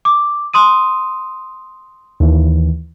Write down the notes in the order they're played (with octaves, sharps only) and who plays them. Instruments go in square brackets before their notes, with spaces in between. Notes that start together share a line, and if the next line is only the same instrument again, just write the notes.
[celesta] D6
C6 D#6 D#7
[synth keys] D#2 E3